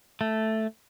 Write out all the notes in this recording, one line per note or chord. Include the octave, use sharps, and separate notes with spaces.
A3